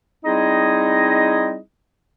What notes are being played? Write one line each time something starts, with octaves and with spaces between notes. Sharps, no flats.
G3 C4 D#4 E4 G#4 D#5